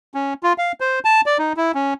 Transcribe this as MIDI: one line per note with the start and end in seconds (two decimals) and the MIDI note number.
0.14 0.34 61
0.43 0.53 65
0.58 0.72 77
0.81 0.99 72
1.05 1.21 81
1.26 1.38 74
1.39 1.53 63
1.57 1.72 64
1.74 1.94 61